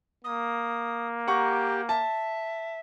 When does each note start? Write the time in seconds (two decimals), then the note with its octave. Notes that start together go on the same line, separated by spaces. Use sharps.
0.24 A#3 D#6
1.27 G4 F#5 A#5 C#6
1.89 E5 A5